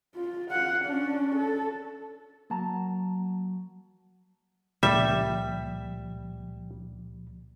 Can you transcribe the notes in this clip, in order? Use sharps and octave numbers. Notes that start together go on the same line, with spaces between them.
F4
F5 F#5
C#4 D4
A4
F#3 A#3 A5 A#5
C#2 A#2 F3 G3 E5